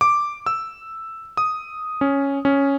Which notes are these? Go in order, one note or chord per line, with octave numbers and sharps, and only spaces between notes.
D6
E6
D#6
C#4
C#4